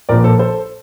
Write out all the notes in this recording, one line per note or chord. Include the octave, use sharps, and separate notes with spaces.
A#1 A#2 F3 A#4 D5
A4 C5
A4 C5